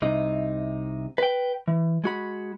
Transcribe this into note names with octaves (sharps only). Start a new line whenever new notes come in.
C2 C3 D#4
B4 G5
E3
G#3 F#4 B5